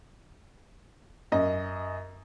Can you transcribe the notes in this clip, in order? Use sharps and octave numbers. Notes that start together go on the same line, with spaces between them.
F#2 D#5